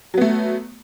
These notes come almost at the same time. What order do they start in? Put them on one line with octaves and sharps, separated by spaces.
F#3 B3 A3